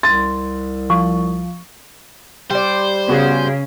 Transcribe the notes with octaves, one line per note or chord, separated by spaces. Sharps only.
C2 C6 A6
F3 C#6
G3 C5 D5
C#3 B3 F#4 G#4